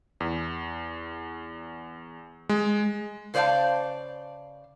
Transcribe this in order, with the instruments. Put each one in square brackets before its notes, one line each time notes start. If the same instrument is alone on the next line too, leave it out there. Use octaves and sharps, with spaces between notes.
[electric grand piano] E2
G#3
[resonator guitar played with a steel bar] C#3 C5 D5 D#5 F5 A5